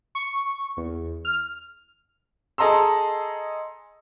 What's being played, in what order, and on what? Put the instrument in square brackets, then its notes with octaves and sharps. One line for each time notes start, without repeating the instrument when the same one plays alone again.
[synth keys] C#6
E2
F6
[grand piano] G#4 A4 D#5 A#5 C6 E6